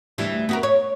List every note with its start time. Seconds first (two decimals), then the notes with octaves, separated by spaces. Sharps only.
0.18 D2 E3 G3
0.49 B3 F#4 A#4
0.63 C#5